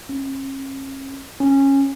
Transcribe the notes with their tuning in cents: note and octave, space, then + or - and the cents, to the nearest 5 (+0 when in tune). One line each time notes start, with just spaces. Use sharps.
C#4 -40
C#4 -15